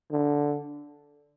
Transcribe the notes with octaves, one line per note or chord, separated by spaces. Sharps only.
D3